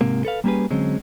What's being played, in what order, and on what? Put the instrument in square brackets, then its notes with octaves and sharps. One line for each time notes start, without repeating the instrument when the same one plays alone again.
[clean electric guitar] G#2 C3 A#3
A4 B4 F5
G3 A#3 C#4 G4 G#4 B4
D3 F#3 G#3 C4 C#4